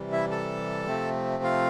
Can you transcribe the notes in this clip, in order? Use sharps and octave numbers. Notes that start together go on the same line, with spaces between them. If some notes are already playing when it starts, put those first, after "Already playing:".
Already playing: C3 E3 G3
E4 E5
A4 A5
C3 F3 A3 C4
F4 F5